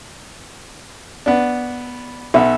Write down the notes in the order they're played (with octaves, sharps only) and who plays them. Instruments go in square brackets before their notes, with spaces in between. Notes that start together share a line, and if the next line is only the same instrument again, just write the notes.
[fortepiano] B3 D4
[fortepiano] B1 B3 [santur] E5